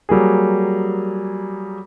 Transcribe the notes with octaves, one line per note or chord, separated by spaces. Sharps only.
F#3 G3 A#3 G#4